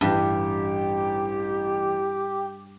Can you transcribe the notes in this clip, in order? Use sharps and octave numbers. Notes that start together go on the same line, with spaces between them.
A1 G2 G4